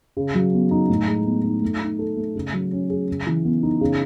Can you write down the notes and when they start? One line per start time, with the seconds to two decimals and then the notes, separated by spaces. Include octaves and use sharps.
0.17 C#3
0.35 F#3
0.53 B3
0.71 D#4
0.89 A2
1.07 G#3
1.25 B3
1.44 D#4
1.63 A3
1.81 D#4
1.99 A4
2.17 A3
2.35 C#3
2.53 F#3
2.72 C#4
2.90 G#4
3.08 C#3
3.27 E3
3.45 B3
3.63 D#4
3.81 C#3